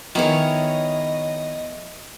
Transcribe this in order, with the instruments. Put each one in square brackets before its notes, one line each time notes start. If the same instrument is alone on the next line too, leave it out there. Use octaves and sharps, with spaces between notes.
[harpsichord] D#3 [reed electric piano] F3 B3 G#4 [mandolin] E4 C#5 [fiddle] D#5